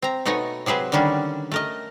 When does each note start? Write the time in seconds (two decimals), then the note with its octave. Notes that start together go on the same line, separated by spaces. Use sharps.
0.02 C4 A#5
0.25 B2 A3 D#4 C#5 F#5 G#5
0.66 C3 F#3 G#4 B4 C5
0.92 D3 D#3 G3 C#4 D4
1.52 A3 A#4 D#5